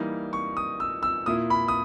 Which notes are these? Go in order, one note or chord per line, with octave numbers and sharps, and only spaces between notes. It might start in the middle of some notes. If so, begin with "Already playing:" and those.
Already playing: E3 G3 A#3 D#4
C#6
D#6
E6
E6
A#2 A#3 E4 D#6
B5
D#6